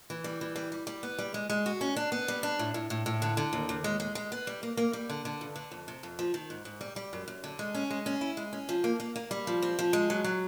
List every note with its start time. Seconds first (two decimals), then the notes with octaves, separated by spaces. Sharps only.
0.10 E3
0.24 G3
0.41 E3
0.56 G3
0.72 G3
0.87 G3
1.03 B3
1.19 G3
1.34 G#3
1.50 G#3
1.66 F#4
1.81 C#4
1.96 D4
2.12 B3
2.28 G3
2.43 D4
2.59 A2
2.74 A2
2.90 A2
3.06 A2
3.22 D3
3.37 D3
3.53 D#2
3.69 D#2
3.84 G#3
4.00 G#3
4.15 G#3
4.32 B3
4.47 G3
4.63 A#3
4.77 A#3
4.93 G3
5.10 D3
5.25 D3
5.41 G2
5.56 D3
5.72 F2
5.88 C3
6.03 F2
6.19 F3
6.34 D#3
6.50 G#2
6.65 G#2
6.81 G3
6.96 G3
7.13 F#2
7.28 F#2
7.44 D3
7.59 G#3
7.74 C#4
7.90 G#3
8.06 C#4
8.21 E4
8.37 G#3
8.53 C#4
8.69 F3
8.84 A#3
9.00 A#3
9.16 A#3
9.31 G3
9.47 F3
9.62 C4
9.79 F3
9.93 G#3
10.10 F#3
10.24 F#3